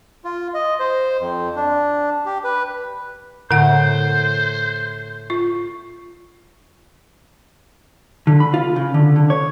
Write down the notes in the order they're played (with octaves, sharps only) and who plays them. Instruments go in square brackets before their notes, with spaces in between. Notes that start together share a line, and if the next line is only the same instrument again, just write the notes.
[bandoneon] F4
D#5
C5
F2
D4
G4
B4
[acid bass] A2 [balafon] D3 F#5 [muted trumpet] C5
[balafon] F4
[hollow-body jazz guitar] D3
B5
F4
C#3
D3
D3
C#5